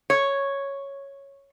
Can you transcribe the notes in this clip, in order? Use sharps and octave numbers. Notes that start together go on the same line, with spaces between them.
C#5